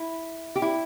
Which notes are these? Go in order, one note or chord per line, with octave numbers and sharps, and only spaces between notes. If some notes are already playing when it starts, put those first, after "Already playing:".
Already playing: E4
G4
E4